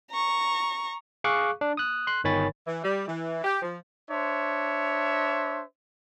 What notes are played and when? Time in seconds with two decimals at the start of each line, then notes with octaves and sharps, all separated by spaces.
0.11 A#5 C#6
1.24 G#4 F5 C#6 D6 F#6
1.61 D4
1.77 D#6 F#6
2.07 C6 F#6
2.24 G1 D#3 C#5 G#5 B5 A6
2.67 E3
2.84 G3
3.08 E3
3.44 G4
3.62 F3
4.10 D4 C5 C#5 E5